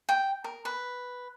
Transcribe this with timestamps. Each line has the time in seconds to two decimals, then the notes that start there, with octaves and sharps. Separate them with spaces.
0.09 G5
0.44 A#4
0.65 B4